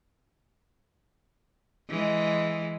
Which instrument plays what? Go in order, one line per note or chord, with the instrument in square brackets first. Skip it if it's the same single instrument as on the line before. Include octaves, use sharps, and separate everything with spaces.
[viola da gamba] E3 G#3